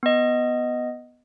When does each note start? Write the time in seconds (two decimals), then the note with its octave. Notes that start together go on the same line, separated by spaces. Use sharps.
0.03 B3 D#5